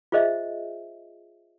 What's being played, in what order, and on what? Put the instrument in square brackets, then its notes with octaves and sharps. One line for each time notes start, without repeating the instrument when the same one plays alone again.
[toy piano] F4 G#4 C5 D#5 E5